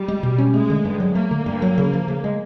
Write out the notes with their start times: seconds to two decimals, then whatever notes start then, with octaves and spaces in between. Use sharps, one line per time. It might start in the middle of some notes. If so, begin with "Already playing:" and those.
Already playing: G3
0.08 G#3
0.23 B2
0.38 C#4
0.54 G#3 A3
0.70 D3
0.85 G2
1.00 F#3
1.15 A3 A#3
1.31 D3
1.46 G2
1.62 F#3
1.78 C#3
1.93 F3
2.08 C#3
2.24 G#3